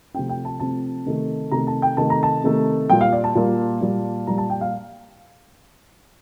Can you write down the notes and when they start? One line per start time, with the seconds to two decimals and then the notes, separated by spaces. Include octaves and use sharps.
0.14 C3 F3 A3 C4 G5
0.29 G5
0.45 A5
0.60 C3 F3 A3 C4 A5
1.06 C3 D#3 A3
1.51 C3 D#3 A3 A#5
1.67 A5
1.82 G5
1.97 C3 D#3 A3 A5
2.10 A#5
2.23 A5
2.44 C3 D#3 A3
2.90 A#2 G3 A#3 G5
3.01 F5
3.13 D5
3.24 A5
3.35 A#2 G3 A#3
3.81 A#2 G3 A#3
4.27 A#2 G3 A#3 A#5
4.38 A5
4.50 G5
4.61 F5